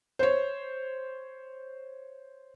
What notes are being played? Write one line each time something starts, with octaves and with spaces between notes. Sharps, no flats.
C5 C#5